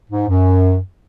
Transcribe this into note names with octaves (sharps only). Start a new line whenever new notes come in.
G#2
F#2